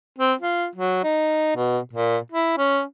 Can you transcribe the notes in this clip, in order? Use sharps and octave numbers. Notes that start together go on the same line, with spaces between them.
C4
F4
F#3
D#4
B2
A#2
E4
C#4